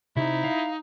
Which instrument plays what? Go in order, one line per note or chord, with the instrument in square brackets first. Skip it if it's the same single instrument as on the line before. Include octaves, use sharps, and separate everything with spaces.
[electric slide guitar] C3 [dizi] D#4 [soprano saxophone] E4
[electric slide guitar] F5